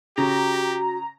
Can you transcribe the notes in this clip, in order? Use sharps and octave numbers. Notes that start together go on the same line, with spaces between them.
C#3 F#4 G4 A#5